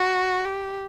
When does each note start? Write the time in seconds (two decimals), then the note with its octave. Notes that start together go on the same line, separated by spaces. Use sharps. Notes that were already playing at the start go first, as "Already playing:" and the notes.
Already playing: F#4
0.45 G4